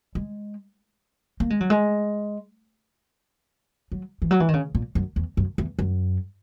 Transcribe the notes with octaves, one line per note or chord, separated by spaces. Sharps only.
G#3
A#3
G#3
F#3
G#3
F#3
E3
F#3
E3
D#3
C#3
A#2
F#2
E2
F#2
E2
F#2